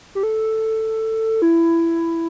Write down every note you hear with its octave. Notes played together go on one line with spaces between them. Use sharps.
G4
A4
E4